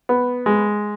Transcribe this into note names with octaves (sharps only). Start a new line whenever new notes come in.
B3
G#3